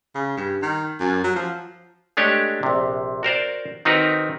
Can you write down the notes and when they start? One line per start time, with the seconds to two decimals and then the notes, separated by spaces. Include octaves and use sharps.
0.15 C#3
0.37 G2
0.62 D#3
1.00 F#2
1.24 F#3
1.36 F3
2.17 G#3 A3 D4 G4 C#5 D#5
2.63 A#1 C3
3.23 F#4 A#4 C5 D5
3.85 D#3 C4 D#4 F#4 A#4 B4